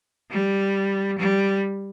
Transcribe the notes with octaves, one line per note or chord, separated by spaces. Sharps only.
G3
G3